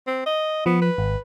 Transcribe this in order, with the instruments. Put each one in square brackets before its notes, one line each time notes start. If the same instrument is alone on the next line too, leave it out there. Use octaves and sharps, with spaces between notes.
[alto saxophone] C4
D#5
[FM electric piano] F3 [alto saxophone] B3
[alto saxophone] B4
[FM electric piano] G#1